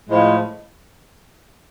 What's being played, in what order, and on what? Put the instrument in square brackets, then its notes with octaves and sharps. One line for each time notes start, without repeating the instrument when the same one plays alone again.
[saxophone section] A2 F3 G#3